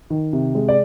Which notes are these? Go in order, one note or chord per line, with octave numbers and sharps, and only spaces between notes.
D#3
C3
G#3
D5